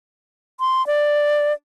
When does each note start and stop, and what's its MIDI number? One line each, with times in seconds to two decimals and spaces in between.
0.60 0.85 84
0.87 1.53 74